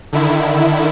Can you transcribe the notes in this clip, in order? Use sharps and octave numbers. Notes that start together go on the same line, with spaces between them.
D3 D#3 E4